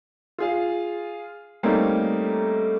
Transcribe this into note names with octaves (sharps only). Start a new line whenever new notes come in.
F4 G#4 F5
G3 A3 A#3 C4 C#4 D#4